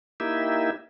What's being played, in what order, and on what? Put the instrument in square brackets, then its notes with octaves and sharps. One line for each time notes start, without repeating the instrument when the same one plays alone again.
[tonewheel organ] A#3 D#4 E4 G4 E5